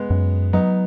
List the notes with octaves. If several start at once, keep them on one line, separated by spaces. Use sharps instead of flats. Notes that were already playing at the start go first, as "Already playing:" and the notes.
Already playing: G#3 B3
F#2
F#3 B3 D#4